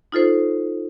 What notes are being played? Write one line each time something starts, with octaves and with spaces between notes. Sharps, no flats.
D#4 F4 A4 C5